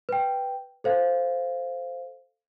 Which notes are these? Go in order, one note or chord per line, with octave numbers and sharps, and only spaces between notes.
B4 G5
A4 C5 F5